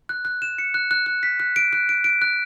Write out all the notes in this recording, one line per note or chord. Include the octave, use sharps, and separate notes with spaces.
F#6
F#6
E7
C#7
F#6
F#6
F#6
B6
F#6
D7
F#6
D7
D7
F#6